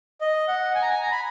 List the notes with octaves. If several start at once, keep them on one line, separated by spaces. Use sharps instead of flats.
D#5
F#5
G#5
A#5
G#5
A#5
B5